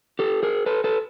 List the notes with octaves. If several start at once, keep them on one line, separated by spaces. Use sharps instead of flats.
G4 A4
G#4 A#4
A4 B4
A4 B4